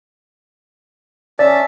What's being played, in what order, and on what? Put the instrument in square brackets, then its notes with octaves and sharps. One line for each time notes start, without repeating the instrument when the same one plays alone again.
[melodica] C#4 E5 A5 [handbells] D5